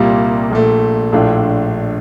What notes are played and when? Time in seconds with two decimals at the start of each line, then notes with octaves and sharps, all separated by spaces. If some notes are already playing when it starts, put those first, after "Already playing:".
Already playing: C2 A#2 G3 A#3 F4
0.51 A#1 A#2 A3
1.12 A#1 A2 A3 D4 F4